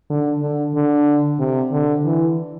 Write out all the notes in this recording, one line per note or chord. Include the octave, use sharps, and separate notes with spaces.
D3
D3
D3
C3
D3
E3